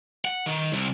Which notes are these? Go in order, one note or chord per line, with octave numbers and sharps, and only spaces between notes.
F#5
D#3
C2